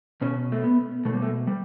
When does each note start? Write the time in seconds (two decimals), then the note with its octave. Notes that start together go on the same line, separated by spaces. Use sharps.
0.21 B2 C#4
0.52 A3
0.64 B3
1.05 B2 A3
1.14 G3
1.22 A3
1.47 G3